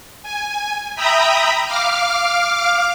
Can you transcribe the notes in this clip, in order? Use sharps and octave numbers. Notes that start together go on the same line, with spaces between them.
G#5
E5 G5 A#5 B5 D#6
F5 D6 F6